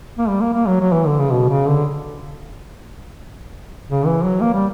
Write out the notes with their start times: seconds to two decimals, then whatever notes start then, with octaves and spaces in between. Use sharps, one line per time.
0.18 A#3
0.29 G3
0.41 A#3
0.54 A#3
0.67 F#3
0.80 F#3
0.92 E3
1.06 D3
1.19 C#3
1.31 B2
1.49 C#3
1.66 D3
3.90 C#3
4.06 E3
4.24 F#3
4.41 A#3
4.53 G3